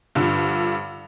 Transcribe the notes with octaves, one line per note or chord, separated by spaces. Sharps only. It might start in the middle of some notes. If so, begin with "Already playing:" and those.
G2 D3 F3